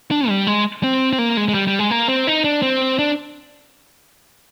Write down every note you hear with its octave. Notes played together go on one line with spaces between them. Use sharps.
D4
G3
G#3
C4
C4
A#3
G#3
G#3
G3
G3
G#3
A#3
C4
D#4
D4
C4
D4